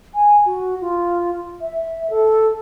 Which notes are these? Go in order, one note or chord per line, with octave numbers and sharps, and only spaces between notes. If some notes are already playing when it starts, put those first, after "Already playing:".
G#5
F#4
F4
E5
A4